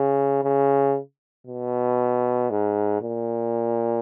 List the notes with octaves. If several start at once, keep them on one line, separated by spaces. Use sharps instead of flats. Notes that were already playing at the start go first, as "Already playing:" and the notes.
Already playing: C#3
C#3
B2
G#2
A#2